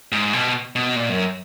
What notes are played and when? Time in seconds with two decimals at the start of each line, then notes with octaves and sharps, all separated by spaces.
0.12 G#2
0.33 B2
0.75 B2
0.96 A#2
1.09 F#2